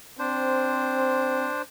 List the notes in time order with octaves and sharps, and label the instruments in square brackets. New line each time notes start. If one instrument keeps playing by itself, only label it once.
[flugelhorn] C4 [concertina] D4 C5